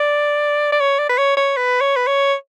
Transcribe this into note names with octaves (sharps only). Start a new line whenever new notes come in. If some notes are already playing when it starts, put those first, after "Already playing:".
Already playing: D5
D5
C#5
D5
B4
C#5
C#5
B4
C#5
B4
C#5